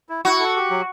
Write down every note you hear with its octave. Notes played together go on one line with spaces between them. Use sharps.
E4
E4 F#4
A4
G4
F#3